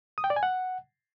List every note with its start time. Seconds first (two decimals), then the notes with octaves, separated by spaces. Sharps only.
0.18 D#6
0.24 G5
0.30 D5
0.36 G#5
0.43 F#5